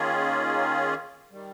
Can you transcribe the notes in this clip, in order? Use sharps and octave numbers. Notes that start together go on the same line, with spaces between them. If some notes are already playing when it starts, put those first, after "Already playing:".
Already playing: D#3 A#3 C#4 F4 G#4
D#3 G3